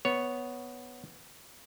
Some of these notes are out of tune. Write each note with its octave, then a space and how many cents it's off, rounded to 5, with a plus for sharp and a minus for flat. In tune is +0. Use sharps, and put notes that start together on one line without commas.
B3 +0 C#5 +0